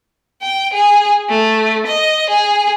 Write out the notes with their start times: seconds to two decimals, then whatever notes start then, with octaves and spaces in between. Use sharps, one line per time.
0.42 G5
0.74 G#4
1.29 A3
1.87 D#5
2.30 G#4